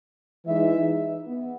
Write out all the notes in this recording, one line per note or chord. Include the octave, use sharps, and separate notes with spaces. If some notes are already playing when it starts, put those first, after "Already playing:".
E3 G#3 D#4 E5
B3